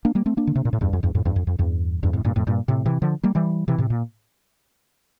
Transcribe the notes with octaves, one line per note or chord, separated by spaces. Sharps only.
A#3 D4
G3 A#3
A3 C4
A#3 D4
D3
C3
A#2
A2
E2 G2
F2
E2 G2
F2 A2
E2 G2
F2
F2
E2 G2
E2 G2
F2 A2
G2 A#2
F2 A2
G2 A#2
A2 C3
C3 E3
D3 F3
G3 A#3
E3 G3
C3 E3
A2 C3
A#2